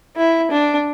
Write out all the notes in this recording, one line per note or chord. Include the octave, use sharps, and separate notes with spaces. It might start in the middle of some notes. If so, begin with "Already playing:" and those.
E4
D4